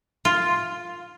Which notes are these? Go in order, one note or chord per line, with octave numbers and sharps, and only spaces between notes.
F4